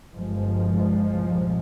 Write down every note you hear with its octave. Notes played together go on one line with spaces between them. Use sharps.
G1 G2 F3 G#3
C2 A#2